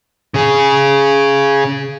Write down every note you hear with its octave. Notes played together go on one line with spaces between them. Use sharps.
C#3 G#4